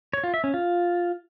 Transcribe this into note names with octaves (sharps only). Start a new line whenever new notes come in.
C#5
F4
E5
C#4
F4